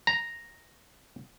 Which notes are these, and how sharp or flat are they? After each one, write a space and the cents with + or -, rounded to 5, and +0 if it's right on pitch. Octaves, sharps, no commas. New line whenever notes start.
A#5 +0